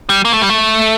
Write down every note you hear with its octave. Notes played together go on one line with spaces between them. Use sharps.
G3
A#3
A3
G3
A3